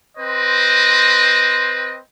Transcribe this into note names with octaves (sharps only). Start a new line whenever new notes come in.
C4 B4 C5 D#5